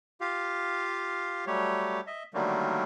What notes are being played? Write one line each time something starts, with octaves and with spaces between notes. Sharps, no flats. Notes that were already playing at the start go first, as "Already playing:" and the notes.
F4 G4 F5
F#3 G3 A3 G4 C#5
D#5 E5
D3 D#3 F#3 G3 A3 A#3